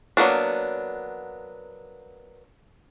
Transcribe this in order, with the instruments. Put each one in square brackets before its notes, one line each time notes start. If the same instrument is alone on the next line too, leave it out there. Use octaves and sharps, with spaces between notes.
[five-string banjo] F#3 A#3 B3 D4